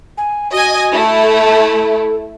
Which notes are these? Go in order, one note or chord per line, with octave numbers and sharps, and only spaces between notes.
G#5
F#4 D#5 G#5
A3 E4
A4